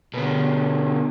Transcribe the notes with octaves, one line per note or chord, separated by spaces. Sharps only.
B2 D3